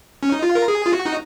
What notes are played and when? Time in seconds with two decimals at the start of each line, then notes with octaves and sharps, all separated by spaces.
0.23 C#4
0.32 D#4
0.43 F4
0.55 A#4
0.68 G#4
0.86 F4
0.93 F#4
1.06 D#4